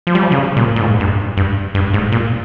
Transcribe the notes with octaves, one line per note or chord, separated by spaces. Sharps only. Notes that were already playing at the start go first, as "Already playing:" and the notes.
F3
G3
F3
C#3
A#2
A#2
G#2
G2
G2
G2
G#2
A#2